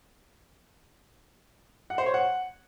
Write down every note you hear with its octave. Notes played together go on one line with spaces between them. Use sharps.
F#5
C5
C#5
F#5